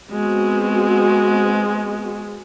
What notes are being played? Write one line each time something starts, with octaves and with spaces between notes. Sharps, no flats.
G#3 B3 C4 F#4